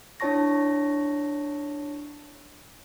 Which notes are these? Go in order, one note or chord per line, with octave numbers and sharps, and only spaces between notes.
D4 E4 C#5 A5 C#6 A#6